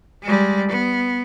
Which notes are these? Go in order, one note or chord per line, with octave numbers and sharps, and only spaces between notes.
G3 G#3
B3